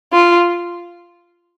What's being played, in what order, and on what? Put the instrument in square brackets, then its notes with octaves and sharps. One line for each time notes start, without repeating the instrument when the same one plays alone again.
[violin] F4